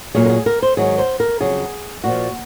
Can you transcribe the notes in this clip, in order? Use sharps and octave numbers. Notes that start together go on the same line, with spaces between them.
A#2 F#3 G#4
A#4
G#4
A#4
C5
G#2 D#3 F#3 G#4
C5
A#4
F2 C#3 F#3 G#4
A#2 F3 F#4